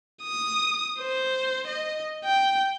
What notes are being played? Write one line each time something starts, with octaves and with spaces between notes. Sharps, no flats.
D#6
C5
D#5
G5